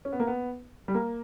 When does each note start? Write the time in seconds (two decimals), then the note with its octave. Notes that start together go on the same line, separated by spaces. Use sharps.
0.05 C#4
0.13 B3
0.20 A#3
0.27 B3
0.88 G3
0.94 A#3